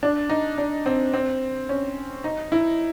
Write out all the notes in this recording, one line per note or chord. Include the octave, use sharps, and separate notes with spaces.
D4
D#4
D4
C4
C4
C#4
D#4
E4